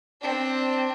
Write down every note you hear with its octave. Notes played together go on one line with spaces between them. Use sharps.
C4 D4